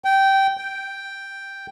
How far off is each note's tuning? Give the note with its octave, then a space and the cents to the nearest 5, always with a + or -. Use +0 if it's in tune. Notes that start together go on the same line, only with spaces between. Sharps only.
G5 -15
G5 +0